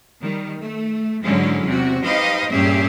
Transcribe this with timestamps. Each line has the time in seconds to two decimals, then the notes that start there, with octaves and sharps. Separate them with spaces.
0.22 D#3 G3
0.60 A3
1.23 G#2 D3 F#3 G#3 C#4 E4
1.67 E2 C3 F#4
2.05 D#4 G4 B4 C5 D#5 F5
2.52 G2 A#2 C#4 G4 G#4 E5